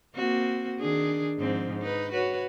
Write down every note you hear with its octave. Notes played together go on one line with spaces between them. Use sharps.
A#3 C4 F#4
D#3 D4 G#4
G#2 F3 C4
D#4 B4
F#4 B4 C#5